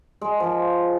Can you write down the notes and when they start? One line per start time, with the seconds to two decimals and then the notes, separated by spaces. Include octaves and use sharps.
0.21 G#3
0.40 F3